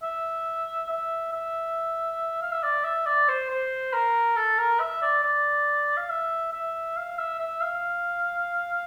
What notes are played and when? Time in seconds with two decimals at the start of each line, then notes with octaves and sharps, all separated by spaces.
0.03 E5
0.89 E5
1.33 E5
2.43 F5
2.52 E5
2.63 D5
2.85 E5
3.06 D5
3.29 C5
3.50 C5
3.93 A#4
4.36 A4
4.58 A#4
4.80 E5
5.02 D5
5.24 D5
5.98 F5
6.10 E5
6.53 E5
6.97 F5
7.19 E5
7.39 E5
7.61 F5